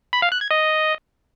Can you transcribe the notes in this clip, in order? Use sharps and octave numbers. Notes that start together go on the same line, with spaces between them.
B5
F5
F#6
G#6
D#5